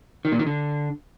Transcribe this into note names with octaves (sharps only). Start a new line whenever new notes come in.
D#3
A#2
D#3
D3